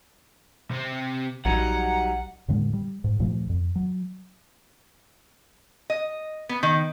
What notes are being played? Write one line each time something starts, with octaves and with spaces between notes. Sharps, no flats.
C3 C4
A#1 F#3 G3 D#4 F#5 A#5
E2 A2 D3 G#3
G3
G#2
D#2 A#2 F3 A3
F2
F#3
D#5
B3
D#3